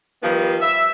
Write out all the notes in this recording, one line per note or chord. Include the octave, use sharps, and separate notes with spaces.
D#3 F3 G3 B3
E5